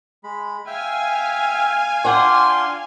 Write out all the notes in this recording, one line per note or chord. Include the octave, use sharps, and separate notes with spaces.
G#3 B5
E5 F5 G5 G#5
D4 F4 D5 F#5 G5 C6